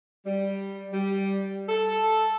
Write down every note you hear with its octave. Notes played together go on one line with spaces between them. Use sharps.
G3
G3
A4